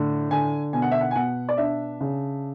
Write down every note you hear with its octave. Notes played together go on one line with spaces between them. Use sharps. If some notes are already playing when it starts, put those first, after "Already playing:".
Already playing: A2 D3
D3 G#5
B2 G#5
F#5
E5
F#5
G#5
B2 F#5
D5
D4 E5
C#3